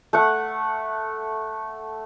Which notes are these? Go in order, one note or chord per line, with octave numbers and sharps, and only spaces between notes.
A3 F#5